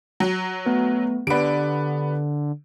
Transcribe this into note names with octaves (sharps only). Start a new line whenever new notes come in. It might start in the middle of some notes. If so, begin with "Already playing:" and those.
F#3
A3 B3 B4
D3 B3 G4 D5 D7